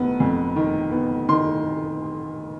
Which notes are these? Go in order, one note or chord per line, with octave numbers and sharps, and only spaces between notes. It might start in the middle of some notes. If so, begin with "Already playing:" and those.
Already playing: F1 D#3 B3
F2
D#3
B3
D#3 C6